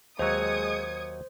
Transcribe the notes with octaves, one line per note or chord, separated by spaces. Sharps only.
D#2 F#3 G#3 C5 D#6 G#6 C#7